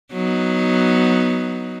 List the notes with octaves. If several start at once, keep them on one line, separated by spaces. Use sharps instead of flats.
F#3 B3 D#4